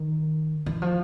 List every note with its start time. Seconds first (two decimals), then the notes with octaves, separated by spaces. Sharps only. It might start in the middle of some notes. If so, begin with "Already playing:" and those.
Already playing: D#3
0.66 E3
0.82 F3